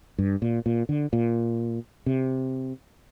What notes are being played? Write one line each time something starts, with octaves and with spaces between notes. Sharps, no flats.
G2
A#2
A#2
D3
A#2
C3